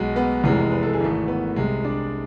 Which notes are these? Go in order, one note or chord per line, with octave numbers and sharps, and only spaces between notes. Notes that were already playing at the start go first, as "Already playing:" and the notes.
Already playing: B1 B2 G#3
B3 B4
F1 E2 C3 E3 G#3
B4
A4
G#4
G#1 G#2 E3 A3 A4
B3 B4
C2 C3 G#3
D4 D5